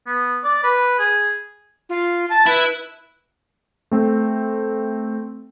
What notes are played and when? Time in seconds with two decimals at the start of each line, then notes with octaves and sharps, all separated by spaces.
0.07 B3
0.44 D5
0.64 B4
0.99 G#4
1.89 F4
2.30 A5
2.46 E4 B4
3.91 A3 C4